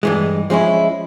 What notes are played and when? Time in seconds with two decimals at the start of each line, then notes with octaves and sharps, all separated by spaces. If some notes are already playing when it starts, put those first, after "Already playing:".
0.03 G2 E3 G#3
0.50 F3 G#3 C#4 E4